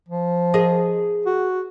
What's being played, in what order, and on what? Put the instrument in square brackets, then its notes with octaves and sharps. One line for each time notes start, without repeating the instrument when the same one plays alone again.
[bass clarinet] F3
[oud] G#4 A#4 D#5
[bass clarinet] F#4